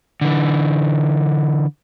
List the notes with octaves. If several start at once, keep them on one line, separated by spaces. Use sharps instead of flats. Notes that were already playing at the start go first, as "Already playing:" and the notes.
D3 E3